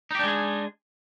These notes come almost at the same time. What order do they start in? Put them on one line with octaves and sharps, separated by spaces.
D#4 G4 D4 G#3 G#4